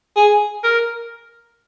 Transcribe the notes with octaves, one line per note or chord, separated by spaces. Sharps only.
G#4
A#4